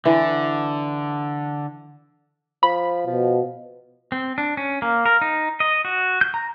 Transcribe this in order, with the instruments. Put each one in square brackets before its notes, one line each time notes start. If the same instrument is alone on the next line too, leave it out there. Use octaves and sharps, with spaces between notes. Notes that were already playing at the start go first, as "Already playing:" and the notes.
[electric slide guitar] D3 [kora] E3
[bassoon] F3 [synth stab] B5
[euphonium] B2 [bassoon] F3
[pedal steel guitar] C4
D4
C#4
A#3
A#4
D#4
D#5
F#4
G6
A#5